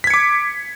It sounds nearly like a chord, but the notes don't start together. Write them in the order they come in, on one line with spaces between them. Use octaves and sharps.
B6 G#6 C#7 D6